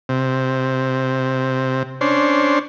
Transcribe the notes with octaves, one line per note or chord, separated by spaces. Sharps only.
C3
C#4 D4 C5